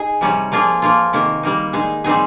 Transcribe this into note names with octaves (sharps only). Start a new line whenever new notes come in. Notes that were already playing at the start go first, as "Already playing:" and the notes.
Already playing: D#4 G#4
C3 G3 C#4
F3 A#3 F4 G#4
F3 A#3 F4
C3 D#3 A#3
G3 A#3 D#4
G#3 D#4 G#4
G3 C4 D#4 G#4